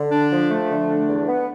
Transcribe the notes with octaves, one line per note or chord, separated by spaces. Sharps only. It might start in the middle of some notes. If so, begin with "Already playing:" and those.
Already playing: D3
D4
F3
A3
D3
D4
E2
B3